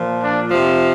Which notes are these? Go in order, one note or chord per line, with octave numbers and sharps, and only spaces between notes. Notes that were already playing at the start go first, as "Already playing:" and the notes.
Already playing: A#2 F3
D4
C3 F3